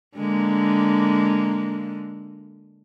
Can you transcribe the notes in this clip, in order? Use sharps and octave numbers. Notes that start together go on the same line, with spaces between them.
D3 G#3 A#3